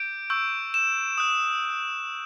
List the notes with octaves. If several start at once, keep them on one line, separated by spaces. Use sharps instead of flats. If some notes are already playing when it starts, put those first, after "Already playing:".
Already playing: D6 G6 D7
C#6 E6 G6
E7
D#6 F#6